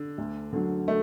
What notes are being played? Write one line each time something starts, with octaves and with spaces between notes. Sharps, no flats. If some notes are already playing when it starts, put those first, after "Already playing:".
Already playing: D3
D2
D3 F#3
A3